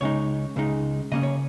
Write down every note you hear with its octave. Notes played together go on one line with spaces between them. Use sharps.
C#2 C#3 G#3 D#4 C#5
C#2 C#3 G#3 D#4
C#3 A#3 C#4 D#5
C#5